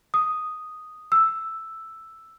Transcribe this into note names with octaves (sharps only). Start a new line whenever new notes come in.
D#6
E6